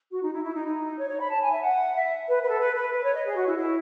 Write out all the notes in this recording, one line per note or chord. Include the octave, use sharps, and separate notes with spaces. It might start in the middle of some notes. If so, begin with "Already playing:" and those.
F#4
D#4
E4
E4
D#4
D#4
C#5
C#5
B5
A5
G#5
E5
F#5
E5
B4
B4
A4
B4
B4
B4
C#5
D#5
G#4
F#4
E4
E4